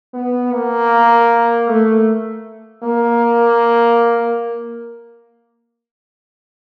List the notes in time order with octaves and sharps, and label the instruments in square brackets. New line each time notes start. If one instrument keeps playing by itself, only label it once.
[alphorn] B3
A#3
A3
A#3